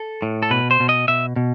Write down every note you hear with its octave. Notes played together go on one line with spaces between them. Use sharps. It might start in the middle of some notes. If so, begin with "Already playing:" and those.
Already playing: A4
A2
A4
B2 B4
C5
B2
D#5
B2 E5
B2